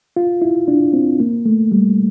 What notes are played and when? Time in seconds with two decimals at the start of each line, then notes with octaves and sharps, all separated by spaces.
0.16 F4
0.42 E4
0.68 D4
0.93 C4
1.20 A#3
1.46 A3
1.72 G3